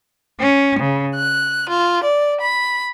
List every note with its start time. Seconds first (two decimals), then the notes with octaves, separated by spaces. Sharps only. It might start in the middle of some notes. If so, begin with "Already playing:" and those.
0.39 C#4
0.78 C#3
1.15 F#6
1.69 F4
2.03 D5
2.41 B5